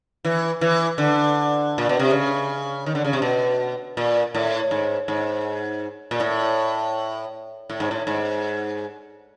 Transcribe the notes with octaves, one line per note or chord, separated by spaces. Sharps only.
E3
E3
D3
A#2
B2
C3
C#3
D#3
D3
C#3
C3
B2
A#2
A2
G#2
G#2
A#2
A2
A2
G#2
A2
G#2